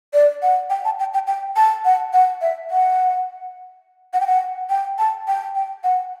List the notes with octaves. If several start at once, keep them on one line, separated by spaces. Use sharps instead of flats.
D5
F#5
G5
A5
G5
G5
G5
A5
F#5
F#5
E5
F#5
F#5
G5
F#5
G5
A5
G5
G5
F#5